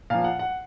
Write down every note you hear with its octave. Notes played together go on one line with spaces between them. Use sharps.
A#2 F3 F5
F#5
F#5